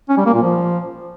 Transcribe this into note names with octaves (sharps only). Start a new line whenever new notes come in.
C#4
G3
A#3
A#2
F3